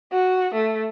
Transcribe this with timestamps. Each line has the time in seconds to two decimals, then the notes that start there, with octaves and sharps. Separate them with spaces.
0.13 F#4
0.55 A3